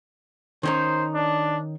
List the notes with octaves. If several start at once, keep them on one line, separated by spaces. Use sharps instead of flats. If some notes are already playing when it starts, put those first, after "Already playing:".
D#3 C#4 D#4 C5
D4